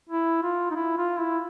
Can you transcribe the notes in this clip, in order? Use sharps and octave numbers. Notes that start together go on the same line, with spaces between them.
E4
F4
D#4
E4
F4
E4